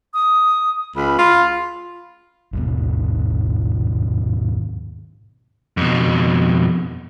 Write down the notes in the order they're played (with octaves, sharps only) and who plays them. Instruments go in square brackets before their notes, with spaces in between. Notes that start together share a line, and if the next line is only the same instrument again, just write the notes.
[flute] D#6
[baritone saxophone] C#2 [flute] B5
[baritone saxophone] F4
[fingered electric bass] G#1 D#2 B2
[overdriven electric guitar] F2 B2